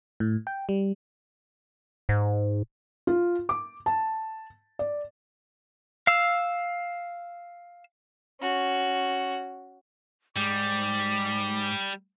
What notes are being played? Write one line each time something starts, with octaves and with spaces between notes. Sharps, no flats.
A2
G5
G3
G#2
F4
D6
A5
D5
F5 E6
C#4 F#4
G#2 G3 D6